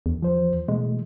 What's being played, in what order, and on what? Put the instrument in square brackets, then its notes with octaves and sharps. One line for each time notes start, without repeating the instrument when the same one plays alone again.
[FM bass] E2
[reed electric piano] F3 C5
[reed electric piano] B2 E3 A3 [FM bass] G#3